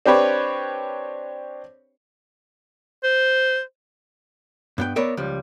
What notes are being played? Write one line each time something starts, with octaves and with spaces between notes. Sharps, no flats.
C4 D4 G4 B4 C#5
C5
G2 B3 G5
B3 A#4 C#5 D5 E5
C#2 F3 G3